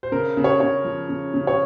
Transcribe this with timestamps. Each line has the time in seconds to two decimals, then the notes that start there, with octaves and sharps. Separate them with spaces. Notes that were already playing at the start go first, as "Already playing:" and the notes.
0.03 C5
0.12 C#3 A#4
0.37 C#3
0.44 C#5
0.60 C#3 C#5
0.85 F3
1.09 C#3
1.34 C#3
1.47 C#5